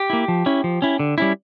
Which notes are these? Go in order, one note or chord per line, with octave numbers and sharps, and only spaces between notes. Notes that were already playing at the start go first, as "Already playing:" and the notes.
Already playing: G4
A#3 E4
F3
C#4 E4
F3
C#4 E4
D3
G3 C#4 E4